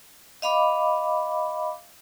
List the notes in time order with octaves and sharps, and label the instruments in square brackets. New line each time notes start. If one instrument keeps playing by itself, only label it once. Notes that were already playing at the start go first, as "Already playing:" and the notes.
[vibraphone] D#5 F5 B5 D6